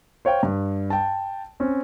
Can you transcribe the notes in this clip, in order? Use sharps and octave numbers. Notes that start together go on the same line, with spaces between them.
C5 C#5 F5 G5
G2
G5 A5
C4 C#4